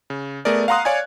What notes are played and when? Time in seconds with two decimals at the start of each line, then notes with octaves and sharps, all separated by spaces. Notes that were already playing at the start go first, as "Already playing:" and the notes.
0.10 C#3
0.45 A3 B3 G#4 A#4 D5
0.68 F5 F#5 A#5 C6 D#6 F#6
0.85 C#5 D5 F5 G#5 G#6